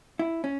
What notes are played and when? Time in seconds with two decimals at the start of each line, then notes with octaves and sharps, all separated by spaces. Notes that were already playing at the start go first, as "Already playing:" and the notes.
0.19 E4
0.44 C#4